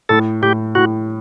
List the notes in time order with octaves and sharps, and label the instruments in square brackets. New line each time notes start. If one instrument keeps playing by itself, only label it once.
[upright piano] A2 [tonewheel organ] A4
[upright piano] A2 [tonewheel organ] G4
[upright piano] A2 [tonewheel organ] F#4